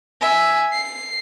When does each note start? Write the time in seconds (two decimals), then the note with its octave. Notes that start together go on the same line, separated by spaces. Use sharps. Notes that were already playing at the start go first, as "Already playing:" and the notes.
0.21 E5 G#5
0.72 C7